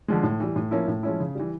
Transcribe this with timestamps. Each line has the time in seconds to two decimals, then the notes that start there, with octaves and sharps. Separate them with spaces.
0.08 D3 F3 G#3
0.23 A2
0.40 E3 G3
0.56 A2
0.71 F3 A#3 C#4 E4
0.88 A2
1.03 F3 G#3 C#4 E4
1.20 C#3
1.35 E3 G3